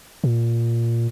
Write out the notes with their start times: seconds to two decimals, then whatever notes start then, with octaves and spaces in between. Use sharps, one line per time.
0.24 A#2